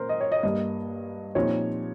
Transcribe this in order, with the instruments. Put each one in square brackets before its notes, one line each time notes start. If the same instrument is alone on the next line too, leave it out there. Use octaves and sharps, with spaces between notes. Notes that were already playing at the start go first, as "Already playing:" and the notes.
Already playing: [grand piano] A#2 G#3 C#4 [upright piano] A#4 C5
[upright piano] D#5
C#5
D#5
[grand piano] G2 G3 A#3 [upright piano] D#5
[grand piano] A#2 F3 C4 D#4 G4 [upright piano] C#5